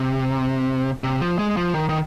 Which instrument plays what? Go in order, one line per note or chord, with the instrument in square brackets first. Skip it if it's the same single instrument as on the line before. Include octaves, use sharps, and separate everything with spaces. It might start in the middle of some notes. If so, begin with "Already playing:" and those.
Already playing: [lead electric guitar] C3
C3
F3
G#3
F3
D#3
D#3